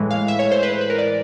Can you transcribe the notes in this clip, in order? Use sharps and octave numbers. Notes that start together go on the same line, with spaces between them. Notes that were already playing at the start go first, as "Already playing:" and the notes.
Already playing: A2 E3 G#3
F5
E5
C#5
C5
B4
C5
B4
A#4
D5